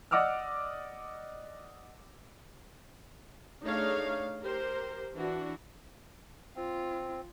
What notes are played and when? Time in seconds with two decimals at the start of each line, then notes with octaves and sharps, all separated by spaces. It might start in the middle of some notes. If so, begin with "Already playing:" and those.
0.11 D5 D#5 F#5 D6 E6 F6
3.64 A3 D4 D#4 G#4 C#5 F5
4.43 G4 A#4 C5
5.14 E3 D4 F#4
6.56 C4 F4